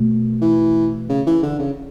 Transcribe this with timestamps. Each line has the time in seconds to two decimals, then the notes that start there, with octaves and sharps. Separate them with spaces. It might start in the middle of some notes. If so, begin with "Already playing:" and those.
Already playing: B2 A3
0.41 E3
1.10 C#3
1.26 E3
1.43 D3
1.59 C#3